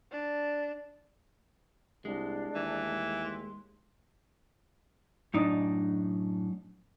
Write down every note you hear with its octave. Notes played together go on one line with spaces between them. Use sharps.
D4
C2 G#3 D4
D#2 E3
C6
F#2 A2 D4 D#4 D5 D#5